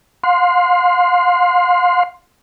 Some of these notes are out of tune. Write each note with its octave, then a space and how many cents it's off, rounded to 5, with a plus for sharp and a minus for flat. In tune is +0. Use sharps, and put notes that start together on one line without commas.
F5 +40 C6 +0